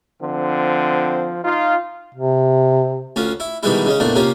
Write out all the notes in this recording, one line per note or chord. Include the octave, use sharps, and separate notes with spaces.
D3 F3 C4
D#4 F4
C3
D2 C#4 F4
E4
B2 D#3 E3 G3 G#3 E4
C#3 G#3 C#4
E2 A#2 A3 D4
C3 A#3 C#4 F4